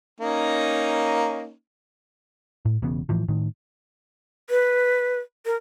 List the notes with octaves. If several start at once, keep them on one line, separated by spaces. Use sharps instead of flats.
A#3 C#4 D#4
A2
E1 E2 C#3 B3
A2 E3 F3
A2 D#3
B4
A#4